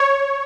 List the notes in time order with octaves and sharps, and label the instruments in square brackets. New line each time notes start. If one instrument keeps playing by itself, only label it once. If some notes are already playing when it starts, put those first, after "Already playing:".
Already playing: [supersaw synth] C#5